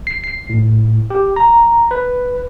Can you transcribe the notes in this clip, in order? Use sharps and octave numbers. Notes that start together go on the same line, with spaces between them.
C7
C7
A2
G4
A#5
B4